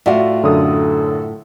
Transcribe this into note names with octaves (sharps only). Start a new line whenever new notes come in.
A2 F4 F#4 D5 E5
F#2 D3 A4 D#6